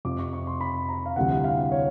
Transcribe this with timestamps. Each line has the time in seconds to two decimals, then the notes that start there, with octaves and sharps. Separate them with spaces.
0.05 F2 C3 F3 D6
0.19 C#6
0.33 C#6
0.47 C6
0.61 B5
0.89 A#5
1.06 F5
1.16 D2 C3 E3 G3 F#5
1.44 F5
1.72 C#5